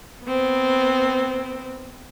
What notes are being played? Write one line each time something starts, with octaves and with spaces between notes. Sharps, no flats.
B3 C4